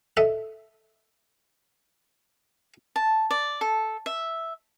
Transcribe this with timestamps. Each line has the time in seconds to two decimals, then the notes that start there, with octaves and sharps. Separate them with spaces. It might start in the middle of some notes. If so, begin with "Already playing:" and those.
0.17 A4 D#5 E5 F#5
2.96 A5
3.30 D5
3.61 A4
4.06 E5